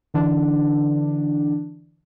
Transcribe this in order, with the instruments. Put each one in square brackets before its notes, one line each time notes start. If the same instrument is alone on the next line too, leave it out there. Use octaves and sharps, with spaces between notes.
[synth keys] D3 E3 D4